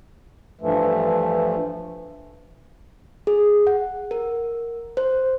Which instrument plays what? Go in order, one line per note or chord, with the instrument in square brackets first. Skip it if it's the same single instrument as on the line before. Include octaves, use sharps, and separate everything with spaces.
[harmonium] G2 E3 F3 A3
[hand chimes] G#4
F#5
A#4
C5